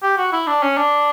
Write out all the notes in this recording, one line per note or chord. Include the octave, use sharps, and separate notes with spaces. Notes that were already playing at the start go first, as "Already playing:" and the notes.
G4
F#4
E4
D4
C#4
D4